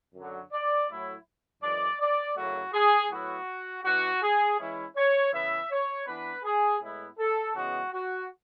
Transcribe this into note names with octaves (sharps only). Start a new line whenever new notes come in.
F#2 D3 F#3
D5
A2 F#3 A3 E4
F#2 E3 G#3 D5
D5
F#2 C#3 F#3 A3 E4 F#4
G#4
A2 F#3 B3 E4 F#4
E3 B3 D4 F#4
G#4
E3 G#3 C#4 E4
C#5
C#3 E3 B3 E4 E5
C#5
E3 B3 D4 B4
G#4
A2 G#3 B3 E4
A4
C#3 E3 G#3 B3 F#4
F#4